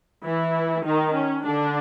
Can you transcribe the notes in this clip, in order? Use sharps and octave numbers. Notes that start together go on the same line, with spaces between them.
E3 E4
D#3 D#4
C#4
D3 D4